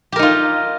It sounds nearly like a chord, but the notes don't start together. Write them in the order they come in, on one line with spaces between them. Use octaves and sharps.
G4 A#4 D#4 F4